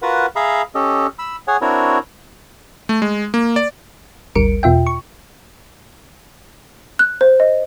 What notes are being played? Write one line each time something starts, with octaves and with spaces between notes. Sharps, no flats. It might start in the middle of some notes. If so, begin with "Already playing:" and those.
F4 F#4 A#4 B4 F#5
G#4 E5 F5 A#5 B5
C#4 G4 A4 D#5
B5 E6
G#4 C#5 F#5 G#5
C4 D4 E4 F#4 A#4 C#5
A3
G#3
A#3
D5
G#1 D2 G3 A#4 C#7 D7
E2 B2 F4 E5 G5
C#6
F#6
C5
D#5